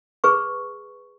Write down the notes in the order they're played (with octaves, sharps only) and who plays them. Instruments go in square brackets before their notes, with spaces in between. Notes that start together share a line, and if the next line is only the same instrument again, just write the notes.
[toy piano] G#4 B4 C#6